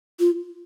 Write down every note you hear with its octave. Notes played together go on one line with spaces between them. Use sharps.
F4